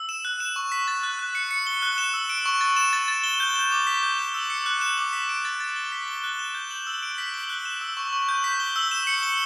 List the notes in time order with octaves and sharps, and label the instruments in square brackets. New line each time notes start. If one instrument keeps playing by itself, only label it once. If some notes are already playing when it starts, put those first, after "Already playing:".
Already playing: [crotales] E6
E7
F#6
E7
C#6
B6
A6
F#6
F#6
C#7
C#7
G7
F#6
E7
E6
D7
C#6
A6
E7
A6
A6
G7
G6
E7
D6
B6
G6
G7
E6
C#7
F#6
E7
D6
B6
D7
A6
A6
G7
B6
G7
F#6
E7
G6
F#7
E6
D7
B6
G7
F#6
E7
E6
C#6
C#6
G6
B6
G7
E6
E7
C#7
G7